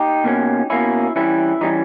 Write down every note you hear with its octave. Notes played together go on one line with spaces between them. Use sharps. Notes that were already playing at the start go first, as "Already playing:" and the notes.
Already playing: D#4 G4
B2 A#3 C#4
B2 A#3 C#4 E4
E3 G3 C#4 E4
E3 G3 C#4 D#4